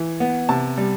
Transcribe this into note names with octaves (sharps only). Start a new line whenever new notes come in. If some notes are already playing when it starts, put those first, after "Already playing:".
Already playing: E3
B3
C3 A5
G3